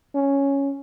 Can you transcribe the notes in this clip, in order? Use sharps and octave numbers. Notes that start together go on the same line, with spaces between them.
C#4